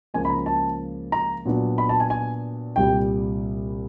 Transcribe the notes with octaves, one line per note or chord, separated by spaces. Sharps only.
C#2 C#3 F3 A#3 G#5
B5
A#5
A5
A#5
A#2 F#3 B3 D4
B5
A5
G#5
G#5
C2 A#2 G3 G5